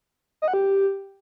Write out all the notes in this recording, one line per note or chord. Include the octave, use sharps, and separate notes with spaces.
D#5
F#5
G4